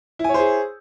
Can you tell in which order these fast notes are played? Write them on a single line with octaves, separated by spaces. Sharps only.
E4 G#5 C#5 C5 G#4